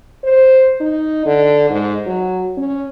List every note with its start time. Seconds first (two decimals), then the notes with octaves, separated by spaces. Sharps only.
0.24 C5
0.80 D#4
1.25 D3
1.70 G#2
2.06 F#3
2.57 C#4